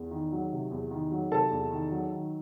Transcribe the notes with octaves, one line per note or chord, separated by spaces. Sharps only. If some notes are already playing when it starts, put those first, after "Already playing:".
Already playing: E2
D#3
F#3
C3
E2
D#3
F#3
C3 A4 A5
E2
D#3
F#3
D#3